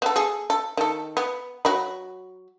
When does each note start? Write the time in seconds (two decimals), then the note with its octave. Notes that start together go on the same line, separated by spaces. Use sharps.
0.02 B3 A4
0.16 G#4 A4
0.50 A4
0.77 D#3 A4
1.17 B3
1.65 F#3 F#4 B5